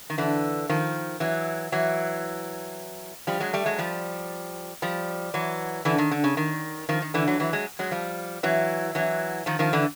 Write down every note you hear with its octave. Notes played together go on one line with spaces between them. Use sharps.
D#3
D3 E3
D#3 F3
E3 F#3
E3 F#3
F3 G3
F#3 G#3
G3 A3
F#3 G#3
F3 G3
F3 G3
E3 F#3
D3 E3
D#3
D3
C#3
D#3
D#3 F3
D#3
D3 E3
E3 F#3
E3 F#3
F#3 G#3
F#3 G#3
F3 G3
E3 F#3
E3 F#3
D#3 F3
D#3 F3
D3 E3